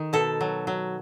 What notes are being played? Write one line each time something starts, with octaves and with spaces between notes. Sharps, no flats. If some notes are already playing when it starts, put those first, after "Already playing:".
Already playing: D#3
B2 A4
F#3
F#3